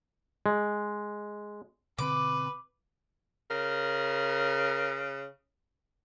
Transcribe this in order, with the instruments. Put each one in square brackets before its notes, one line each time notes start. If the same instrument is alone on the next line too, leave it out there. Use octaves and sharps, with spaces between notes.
[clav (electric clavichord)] G#3
[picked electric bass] B2 D3 C4 [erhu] B4 [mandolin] D6
[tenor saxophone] C#3 [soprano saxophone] A#4